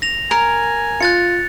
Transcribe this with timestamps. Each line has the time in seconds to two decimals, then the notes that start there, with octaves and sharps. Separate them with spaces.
0.02 A#6 F7
0.31 A#4 G#5
1.00 F4 F#6 A6 C#7